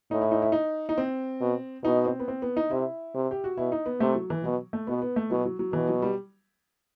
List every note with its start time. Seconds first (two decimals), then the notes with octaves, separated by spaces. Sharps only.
0.11 A2 D#4
0.21 E4
0.31 D#4
0.42 E4
0.52 D#4
0.89 D#4
0.98 C4
1.41 B2
1.84 B2 D#4
2.06 C4
2.20 B3
2.28 C4
2.42 B3
2.57 D#4
2.71 C3 E4
3.15 C3
3.31 G4
3.44 F#4
3.57 B2 E4
3.72 D#4
3.86 B3
4.00 C3 A3
4.15 F#3
4.30 E3
4.44 B2 F#3
4.73 A3
4.87 B2 B3
5.02 B3
5.16 A3
5.31 B2 F#3
5.45 F#3
5.59 F#3
5.73 B2 E3
5.89 F#3
6.02 G3